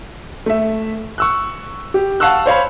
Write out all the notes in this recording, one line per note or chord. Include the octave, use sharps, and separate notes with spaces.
A3 E5
C#6 E6 F#6
G4
F5 F#5 A5 C#6 E6 F#6
C5 C#5 F5 B5